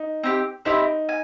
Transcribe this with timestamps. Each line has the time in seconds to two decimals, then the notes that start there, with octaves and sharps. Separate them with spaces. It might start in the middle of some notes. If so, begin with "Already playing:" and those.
Already playing: D#4
0.23 C4 E4 G4
0.65 C4 D#4 E4 G4
1.09 G#5